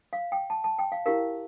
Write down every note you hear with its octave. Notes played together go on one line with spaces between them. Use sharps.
F5
G5
A5
A5
G5
F5
E4 G4 A#4 F5